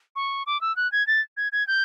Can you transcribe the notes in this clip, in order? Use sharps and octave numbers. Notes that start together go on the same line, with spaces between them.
C#6
D6
E6
F#6
G#6
A6
G#6
G#6
G6